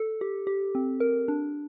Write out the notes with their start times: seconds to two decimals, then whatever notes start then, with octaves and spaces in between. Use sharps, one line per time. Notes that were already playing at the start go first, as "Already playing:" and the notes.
Already playing: A4
0.21 G4
0.47 G4
0.75 C4
1.00 A#4
1.28 D4